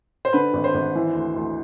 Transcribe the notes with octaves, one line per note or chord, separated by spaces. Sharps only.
C5
D3 B4
G#1
C5
G#1
E3
D2
D2